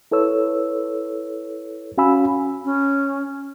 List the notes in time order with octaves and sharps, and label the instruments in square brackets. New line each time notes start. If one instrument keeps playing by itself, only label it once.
[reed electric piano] E4 A4 B4 C#5 E6
C#4 F#4 F5 G#5 B5 E6
[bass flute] C#4